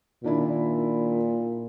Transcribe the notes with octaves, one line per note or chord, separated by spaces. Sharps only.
A#2 D#3 D4 E4